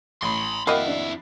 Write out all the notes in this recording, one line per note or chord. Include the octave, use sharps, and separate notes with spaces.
A1 B5 C6
F2 A#3 E4 F#4 D#5 G5 B5 C7
D4